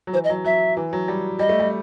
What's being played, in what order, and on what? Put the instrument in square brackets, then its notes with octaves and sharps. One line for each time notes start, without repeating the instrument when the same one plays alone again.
[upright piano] F#3
[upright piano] E3 [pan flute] C5
[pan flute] D#5
[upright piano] F#3
[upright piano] F#3 [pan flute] E5
[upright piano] E3
F#3
G3
[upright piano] G3 [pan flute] D#5
[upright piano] A3
G3